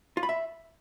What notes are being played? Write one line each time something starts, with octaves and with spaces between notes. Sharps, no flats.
F4
B5
E5